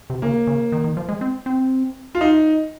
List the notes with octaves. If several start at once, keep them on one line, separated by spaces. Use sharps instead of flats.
C3
C#3 A#3
C#3
D#3
D#3
F3
G#3
C4
C4
F4
D#4